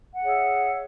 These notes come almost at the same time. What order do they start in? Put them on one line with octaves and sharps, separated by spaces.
F#5 G#4 C#5 E5